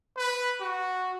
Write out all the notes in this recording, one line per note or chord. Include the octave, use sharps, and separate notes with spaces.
B4
F#4